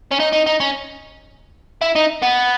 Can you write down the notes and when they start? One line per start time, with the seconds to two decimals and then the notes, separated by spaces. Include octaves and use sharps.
0.11 C#4
0.20 D#4
0.32 D#4
0.46 D#4
0.60 C#4
1.82 E4
1.96 D#4
2.23 B3